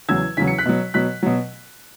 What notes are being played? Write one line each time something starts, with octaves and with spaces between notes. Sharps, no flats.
E2 C#3 F#3 E6 G#6
E2 C#3 F#3 B6
C#7
F#6 B6
B2 F#3
B2 F#3 F#6 B6
B2 F#3